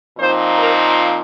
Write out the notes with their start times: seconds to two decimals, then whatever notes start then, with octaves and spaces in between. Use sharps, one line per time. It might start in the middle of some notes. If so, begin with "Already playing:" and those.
0.19 A#2 F3 C4 D#4 C5
0.58 A#4